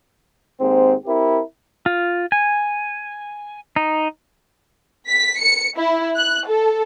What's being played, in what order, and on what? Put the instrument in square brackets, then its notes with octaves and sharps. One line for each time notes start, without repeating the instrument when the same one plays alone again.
[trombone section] D#2 G#2 C4
C4 E4 G4 A#4
[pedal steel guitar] F4
G#5
D#4
[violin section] B6
C#7
E4
F#6
A4